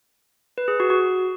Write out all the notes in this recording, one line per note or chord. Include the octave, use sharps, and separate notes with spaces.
B4
G#4
F#4
F#4